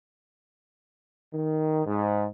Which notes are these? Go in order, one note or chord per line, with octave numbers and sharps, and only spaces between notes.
D#3
G#2